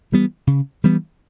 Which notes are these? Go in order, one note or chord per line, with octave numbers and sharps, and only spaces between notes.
E3 G3 B3
C#3
E3 G3 B3